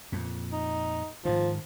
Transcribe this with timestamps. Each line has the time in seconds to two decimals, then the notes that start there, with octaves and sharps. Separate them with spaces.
0.12 F2 A#2
0.52 D#4
1.25 G#2 D#3 F3